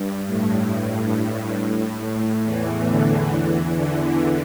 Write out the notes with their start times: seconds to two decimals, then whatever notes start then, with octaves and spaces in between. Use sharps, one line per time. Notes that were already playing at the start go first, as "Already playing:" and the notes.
Already playing: G2
0.27 A2
2.45 E2 E3
2.89 D3
3.32 E2 E3
3.75 D3